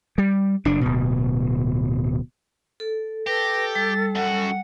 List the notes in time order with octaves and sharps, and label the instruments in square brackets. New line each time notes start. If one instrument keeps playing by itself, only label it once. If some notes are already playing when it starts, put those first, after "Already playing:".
[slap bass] G3
F#1 D4
D1 B2
[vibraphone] A4
[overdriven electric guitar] G4 [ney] A4 [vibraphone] B4 [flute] A#6
[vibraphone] G3 [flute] A6
[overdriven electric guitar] F#2 F#4 [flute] F#5